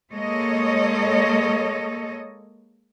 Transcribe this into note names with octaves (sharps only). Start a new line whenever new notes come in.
G#3 A#3 A4 C#5 D#5